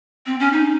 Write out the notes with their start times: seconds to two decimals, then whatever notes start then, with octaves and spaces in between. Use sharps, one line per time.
0.26 C4
0.40 C#4
0.53 D#4